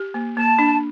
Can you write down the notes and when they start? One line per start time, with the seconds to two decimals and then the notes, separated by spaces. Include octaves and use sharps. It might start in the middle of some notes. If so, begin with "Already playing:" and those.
Already playing: G4
0.14 A#3
0.37 A#3 A5
0.59 D4